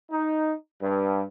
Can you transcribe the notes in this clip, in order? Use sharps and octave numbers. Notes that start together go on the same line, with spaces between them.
D#4
G2